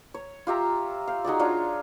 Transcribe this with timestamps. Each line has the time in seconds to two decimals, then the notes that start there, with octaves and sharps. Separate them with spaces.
0.14 C#5
0.47 F4 G4 E5 A#5
1.07 F5 G5
1.25 D#4 F#4 G#4 D5
1.39 D4 F4 C#5